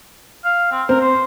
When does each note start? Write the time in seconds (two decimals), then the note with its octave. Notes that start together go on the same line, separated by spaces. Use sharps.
0.45 F5
0.71 C4
0.89 C4 A#4
1.00 C5